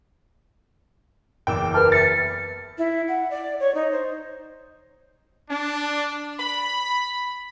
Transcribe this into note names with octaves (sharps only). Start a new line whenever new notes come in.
F#1 E2 G5 D6 E6
A#4 B4 A5 F6
E5 A6 C#7
E4
F#5
D5
C#5
D#4
C5
D4
B5